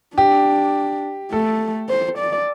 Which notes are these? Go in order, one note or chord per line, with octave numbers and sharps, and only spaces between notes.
D4 G4
A3 A4
C5
D5